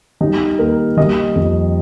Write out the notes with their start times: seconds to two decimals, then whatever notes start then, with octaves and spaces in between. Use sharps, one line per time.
0.21 G3 D#4
0.59 D#2 A#4
0.97 G3 D#5
1.35 F2